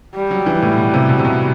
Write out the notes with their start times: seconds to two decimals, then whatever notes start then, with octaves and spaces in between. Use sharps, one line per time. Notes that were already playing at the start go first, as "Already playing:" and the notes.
0.15 G3
0.31 F#3
0.46 E3
0.62 A2
0.77 B2
0.94 C3
1.09 B2
1.19 C3
1.25 B2